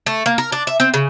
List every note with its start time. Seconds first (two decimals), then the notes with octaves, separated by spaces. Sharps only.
0.06 A3
0.26 A#3
0.38 A#4
0.52 D4
0.67 E5
0.80 C4
0.94 C#3